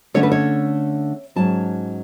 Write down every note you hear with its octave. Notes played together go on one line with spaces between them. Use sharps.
D3 A3 C#4 C#5
B4
C#5
G#2 F#3 C#4 A5